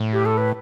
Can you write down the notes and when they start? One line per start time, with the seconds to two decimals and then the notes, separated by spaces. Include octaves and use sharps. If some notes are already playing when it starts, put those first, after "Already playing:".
Already playing: A2
0.13 G4
0.26 A4
0.38 B4